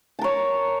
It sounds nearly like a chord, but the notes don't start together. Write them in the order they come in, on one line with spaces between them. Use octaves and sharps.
A5 A#4 C#5